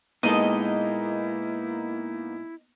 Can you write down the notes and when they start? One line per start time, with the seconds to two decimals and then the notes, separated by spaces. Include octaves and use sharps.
0.23 A#2 G#3 A#3 B3 D#4 E4 A4 D#5